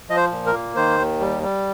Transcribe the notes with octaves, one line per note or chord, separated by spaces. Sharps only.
F3 D#5
C5
A#2
A#4
A#3
D#3 C5
D#2
G3
G3